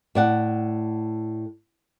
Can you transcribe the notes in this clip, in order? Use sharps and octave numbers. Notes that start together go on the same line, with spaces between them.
A2 D5 F#5